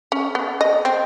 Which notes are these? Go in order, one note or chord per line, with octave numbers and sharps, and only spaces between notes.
C#4
B3
D#5
C4